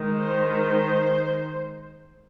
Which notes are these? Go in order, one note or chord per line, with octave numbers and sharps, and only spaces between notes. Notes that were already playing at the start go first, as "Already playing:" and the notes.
Already playing: D#3 G#3 D#4
C5
C5